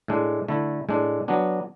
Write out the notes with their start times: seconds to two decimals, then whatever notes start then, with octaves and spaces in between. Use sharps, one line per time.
0.08 A2 G#3 D4
0.48 D3 A3 E4
0.89 A2 G#3 D4
1.28 F#3 B3 D4